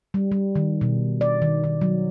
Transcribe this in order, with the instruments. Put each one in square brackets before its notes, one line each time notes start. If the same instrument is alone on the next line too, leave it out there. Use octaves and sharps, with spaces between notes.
[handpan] G3
G3
D#3
B2
D5
D#3
D#3
F#3